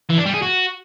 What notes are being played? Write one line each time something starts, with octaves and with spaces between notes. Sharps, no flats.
E3
D4
G3
G#4
F#4